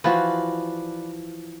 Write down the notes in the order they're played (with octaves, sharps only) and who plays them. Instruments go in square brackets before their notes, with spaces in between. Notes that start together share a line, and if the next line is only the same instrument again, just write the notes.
[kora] E3 F3 F#4 [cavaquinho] B4 D5 F5